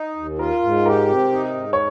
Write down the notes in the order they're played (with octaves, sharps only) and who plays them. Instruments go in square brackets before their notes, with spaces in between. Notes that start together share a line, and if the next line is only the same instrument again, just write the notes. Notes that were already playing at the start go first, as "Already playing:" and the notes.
Already playing: [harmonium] D#4
D#2
[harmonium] F4 [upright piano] A#4
[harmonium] G#2
[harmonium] G4 [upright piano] A#4
[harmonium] C3
D#4
G#2
[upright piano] C#5